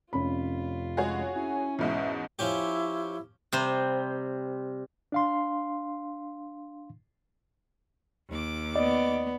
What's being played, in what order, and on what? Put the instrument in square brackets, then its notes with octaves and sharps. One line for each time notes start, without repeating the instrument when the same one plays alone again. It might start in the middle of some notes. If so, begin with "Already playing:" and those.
[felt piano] F1 C#4 B5 [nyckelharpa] F4
[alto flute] G#3 [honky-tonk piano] F#4 G#4 C#5
[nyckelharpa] C#4 [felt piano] E4 [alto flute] G#5
[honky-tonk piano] E2 G#2 B2 [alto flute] E5
[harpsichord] F3 C#4 G4 [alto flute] E4
[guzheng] C3 G3 C5
[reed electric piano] D4 F5 C6
[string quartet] D#2 D6
[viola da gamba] B3 [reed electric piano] D5 [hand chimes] D#5